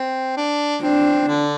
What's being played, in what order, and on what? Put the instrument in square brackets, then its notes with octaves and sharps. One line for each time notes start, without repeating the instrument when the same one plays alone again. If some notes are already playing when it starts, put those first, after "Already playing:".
Already playing: [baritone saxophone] C4
D4
[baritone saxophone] C4 [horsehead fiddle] D4
[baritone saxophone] D3